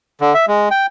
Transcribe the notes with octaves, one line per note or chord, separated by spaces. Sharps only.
D3
E5
G#3
G5